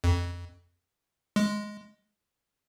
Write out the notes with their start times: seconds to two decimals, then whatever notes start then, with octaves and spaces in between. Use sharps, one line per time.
0.04 F2
1.36 G#3